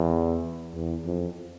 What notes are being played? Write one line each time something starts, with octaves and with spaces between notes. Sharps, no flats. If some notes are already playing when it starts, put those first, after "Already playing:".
Already playing: E2
E2
F2